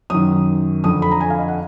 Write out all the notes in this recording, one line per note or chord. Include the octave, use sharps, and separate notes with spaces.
F#2 D#3 D#6
F2 D3 D#6
B5
A#5
G#5
F5
D#5
F#5